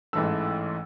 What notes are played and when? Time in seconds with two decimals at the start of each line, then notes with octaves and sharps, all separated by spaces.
0.13 A1 G#2 E3 A3 E6